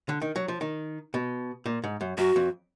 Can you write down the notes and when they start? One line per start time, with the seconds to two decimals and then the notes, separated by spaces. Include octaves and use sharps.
0.09 D3
0.21 D#3
0.36 F#3
0.48 F3
0.61 D#3
1.14 B2
1.66 A#2
1.84 G#2
2.01 F#2
2.18 F#2 F#4
2.36 F2